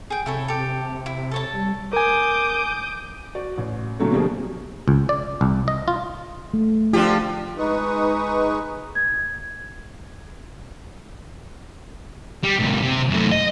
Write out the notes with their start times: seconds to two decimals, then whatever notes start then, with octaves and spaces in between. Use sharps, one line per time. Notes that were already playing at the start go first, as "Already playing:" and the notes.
0.10 G#4 G5
0.26 C3 E4 A4 C#5
0.48 G4 A4
1.06 E4
1.31 A4 C#5 A5
1.53 G3
1.93 A#4 G#5 D6 D#6 G6
3.35 F#4 D5
3.58 A1
3.99 A#2 D3 F#3 A3
4.12 B2 D3 F3 G3 A#3 G#4
4.88 C#2
5.09 D5
5.41 C2
5.68 D#5
5.88 F4
6.54 A3
6.93 D3 F3 F4 G4
7.58 G#3 D#4 B4 C#6 D#6
8.95 G#6
12.44 G3
12.60 C#2 F#2
12.83 C3
13.10 F#2 A3
13.32 D#5